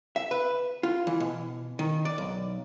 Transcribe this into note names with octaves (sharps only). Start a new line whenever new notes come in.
E5
B4
F4
E3
B2
D#3
D5
B1